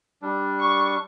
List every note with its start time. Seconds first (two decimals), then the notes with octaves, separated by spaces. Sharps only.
0.22 G3 D4
0.60 C#6